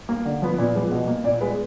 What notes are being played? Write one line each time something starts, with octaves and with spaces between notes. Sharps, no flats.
A#3
D3
F3 B3
A#2
F3 G#3 B3
B2
A#3
A#2 D5
G#3 B3 B4